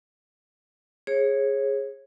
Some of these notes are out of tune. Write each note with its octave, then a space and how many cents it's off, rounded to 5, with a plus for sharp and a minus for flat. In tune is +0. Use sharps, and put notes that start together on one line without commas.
G#4 -5 C#5 -30